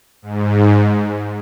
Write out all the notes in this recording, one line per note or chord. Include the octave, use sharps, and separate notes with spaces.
G#2